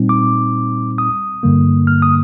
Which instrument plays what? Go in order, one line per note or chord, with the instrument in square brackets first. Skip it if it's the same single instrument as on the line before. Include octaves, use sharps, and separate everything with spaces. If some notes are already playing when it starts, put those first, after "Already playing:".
Already playing: [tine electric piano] A#2 G3 C4 D#4
D6
D#6
G2 D3 G3 A#3
F6
D#6